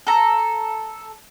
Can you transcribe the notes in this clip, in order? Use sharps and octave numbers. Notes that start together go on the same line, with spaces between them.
A4 A#5